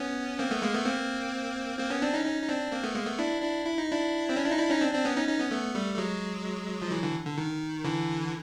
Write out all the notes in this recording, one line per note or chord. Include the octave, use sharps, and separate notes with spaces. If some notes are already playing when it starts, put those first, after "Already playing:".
Already playing: B3 C#4
A#3 C4
A3 B3
G#3 A#3
A3 B3
A#3 C4
A#3 C4
B3 C#4
C4 D4
C#4 D#4
C#4 D#4
D#4
C4 D4
A#3 C4
A3 B3
G#3 A#3
A3 B3
D4 E4
D4 E4
E4
D#4
D4 E4
C4
C#4
D4
D#4
D4 E4
C#4 D#4
C4 D4
C4 D4
B3 C#4
C#4 D#4
C#4 D#4
B3 C#4
A3 B3
G3 A3
A3
F#3 G#3
F3
E3 F#3
D3 E3
D3
D#3
D3 E3